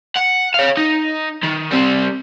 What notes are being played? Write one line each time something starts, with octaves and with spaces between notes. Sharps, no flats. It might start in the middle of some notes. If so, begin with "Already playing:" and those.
F#5
C#5 F5
D#4
D#3
G3 C4